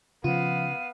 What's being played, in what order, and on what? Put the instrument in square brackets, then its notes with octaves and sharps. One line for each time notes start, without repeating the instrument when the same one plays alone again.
[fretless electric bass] C#3 [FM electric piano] F3 F4 [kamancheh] B3 F5 [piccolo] D#7